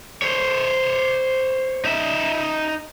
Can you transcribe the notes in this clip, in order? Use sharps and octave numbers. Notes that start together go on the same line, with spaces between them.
C5 C#5
D#4 E5